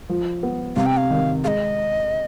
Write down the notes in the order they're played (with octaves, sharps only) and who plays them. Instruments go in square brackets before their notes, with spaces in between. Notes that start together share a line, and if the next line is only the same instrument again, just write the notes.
[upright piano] F3
B3
[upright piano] C3 [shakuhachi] F5
[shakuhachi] G5
F5
[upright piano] D#3
[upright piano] G#3 [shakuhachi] D#5 F5